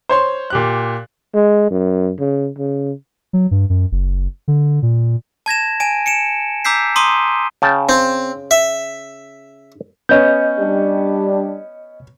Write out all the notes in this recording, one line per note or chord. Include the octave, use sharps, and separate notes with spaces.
C5 C#5 C6
A#2 G4 F#6
G#3
F#2
C#3
C#3
F#3
G2
F#2
F#1
D3
A#2
A5 G#6 A#6 E7
G#5 D7 D#7
C#7 D7 E7
A#5 D6 E6 G6 B6 C7
A#5 C6 D6 D#6 D#7 G7
C#3 G5 A5
C4
E5
B3 C#4 D#5 G6
G3 D4 G4